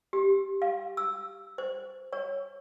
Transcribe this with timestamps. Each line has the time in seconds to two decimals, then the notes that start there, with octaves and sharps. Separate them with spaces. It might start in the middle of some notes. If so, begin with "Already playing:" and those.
0.13 G4
0.62 F5
0.97 E6
1.58 C5
2.13 C#5